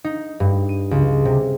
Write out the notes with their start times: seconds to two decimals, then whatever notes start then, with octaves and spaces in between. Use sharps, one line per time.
0.04 D#4
0.40 G2
0.69 D#7
0.91 C#2
1.25 C3